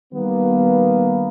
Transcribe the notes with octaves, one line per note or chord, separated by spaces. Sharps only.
D#3 G3 A#3 B3